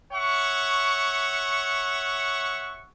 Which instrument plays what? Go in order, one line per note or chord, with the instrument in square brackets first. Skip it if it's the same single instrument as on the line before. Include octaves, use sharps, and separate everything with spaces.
[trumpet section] C#5 E5 F#5 C#6